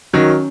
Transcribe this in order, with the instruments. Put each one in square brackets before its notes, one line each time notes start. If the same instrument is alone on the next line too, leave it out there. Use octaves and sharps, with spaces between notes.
[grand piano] D#3 F#3 [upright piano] C#4